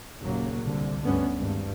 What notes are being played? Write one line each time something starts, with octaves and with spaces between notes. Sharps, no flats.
F#1 D#2 A#2 C#3 F#3 A#3
C2 D3
D2 G2 B3 C#4
G#1 G2